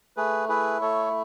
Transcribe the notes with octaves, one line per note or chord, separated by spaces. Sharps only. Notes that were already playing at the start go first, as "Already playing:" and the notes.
A3 G#4 B4
E4 G#4 B4
A3 A4 C#5